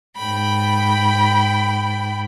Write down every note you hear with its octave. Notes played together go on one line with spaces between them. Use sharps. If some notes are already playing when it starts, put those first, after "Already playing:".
G#2 G5 B5